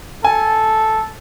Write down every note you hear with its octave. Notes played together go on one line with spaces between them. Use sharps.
A4 G#5